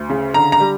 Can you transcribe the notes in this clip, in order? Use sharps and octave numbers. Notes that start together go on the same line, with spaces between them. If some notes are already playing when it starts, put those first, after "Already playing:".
Already playing: D2
C#3
D3 A#5
A#5
G3